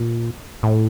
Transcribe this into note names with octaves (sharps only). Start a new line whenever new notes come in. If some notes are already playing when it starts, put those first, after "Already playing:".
Already playing: A#2
A2